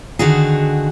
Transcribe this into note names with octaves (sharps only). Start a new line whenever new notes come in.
D3 D#3 F#4 G#4